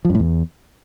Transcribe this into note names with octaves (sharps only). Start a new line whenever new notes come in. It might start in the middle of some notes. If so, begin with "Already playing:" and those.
F3
F#2
A2
E2